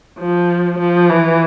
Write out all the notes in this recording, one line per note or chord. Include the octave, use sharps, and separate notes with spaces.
F3
F3
E3